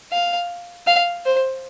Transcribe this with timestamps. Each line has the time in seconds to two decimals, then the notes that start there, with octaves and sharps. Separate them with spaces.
0.12 F5
0.87 F5
1.26 C5